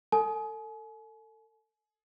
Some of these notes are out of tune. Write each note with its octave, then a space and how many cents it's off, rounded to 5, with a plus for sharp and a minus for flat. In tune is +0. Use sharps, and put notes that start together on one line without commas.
A4 +30 G#5 +40